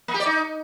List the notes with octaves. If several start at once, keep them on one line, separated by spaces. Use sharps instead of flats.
A#3
G4
D5
D#4